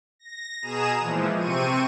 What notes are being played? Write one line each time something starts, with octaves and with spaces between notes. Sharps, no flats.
A#6
B2 G#4 A#5 D#6 E7
A#2 E3 F3 G#3
C3 C4 C#6 D#7